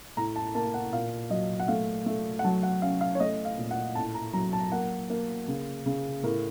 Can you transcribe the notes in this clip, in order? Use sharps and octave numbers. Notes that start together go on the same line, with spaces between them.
A2 A#5
A5
A#3 A5
F#5
A#2 F5
F#3 D#5
F#5
A3 F5
A3
F#5
F#3 A5
F#5
C#4 F5
F5
C#5
A3 D#5
F5
A#2
F#5
A2 A5
A#5
F#3 A#5
A5
A#3 F#5
A#3
C#3
C#3
A2 A#4